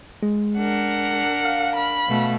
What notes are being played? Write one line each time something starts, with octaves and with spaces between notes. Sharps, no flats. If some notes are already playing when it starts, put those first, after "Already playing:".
G#3
D4 A#4 F#5
F5
B5
B2 A3